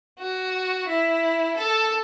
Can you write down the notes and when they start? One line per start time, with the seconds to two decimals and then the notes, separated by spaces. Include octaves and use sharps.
0.20 F#4
0.88 E4
1.57 A4